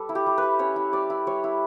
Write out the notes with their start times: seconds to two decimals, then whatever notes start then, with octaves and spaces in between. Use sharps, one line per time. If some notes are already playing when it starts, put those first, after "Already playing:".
Already playing: G3 A4 B4
0.09 E4
0.15 G4
0.26 G3
0.38 G3 B4
0.59 C#4 C#5
0.76 E4
0.93 G3 D5
1.10 E4
1.27 G3 C#5
1.44 E4